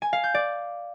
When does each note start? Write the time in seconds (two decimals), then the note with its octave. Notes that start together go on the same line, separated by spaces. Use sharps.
0.02 G#5
0.13 F5
0.24 G6
0.34 D5